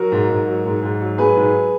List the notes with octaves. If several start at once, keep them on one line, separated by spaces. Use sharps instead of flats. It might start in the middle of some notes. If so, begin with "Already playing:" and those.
Already playing: F#3 F#4 A#4
G#2
G#2
F#3
G#2
G#2
F#3
F#3 G#4 B4
G#2